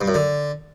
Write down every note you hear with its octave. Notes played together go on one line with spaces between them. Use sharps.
G2
F#2
D3